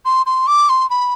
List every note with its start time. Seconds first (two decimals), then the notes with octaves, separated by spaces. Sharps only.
0.05 C6
0.26 C6
0.47 D6
0.69 C6
0.89 B5